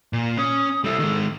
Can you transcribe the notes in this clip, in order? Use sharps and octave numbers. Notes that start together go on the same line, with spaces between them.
A#2
C#4 D#6
G3 E4 A4
D#3 G#3